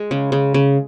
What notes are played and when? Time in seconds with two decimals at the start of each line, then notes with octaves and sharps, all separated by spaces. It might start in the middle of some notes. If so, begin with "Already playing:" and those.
Already playing: G#3
0.11 C#3
0.32 C#3
0.54 C#3